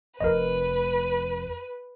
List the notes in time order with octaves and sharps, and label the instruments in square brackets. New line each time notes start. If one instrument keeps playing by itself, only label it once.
[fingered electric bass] F1 F2 [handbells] A#4 D#5 [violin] B4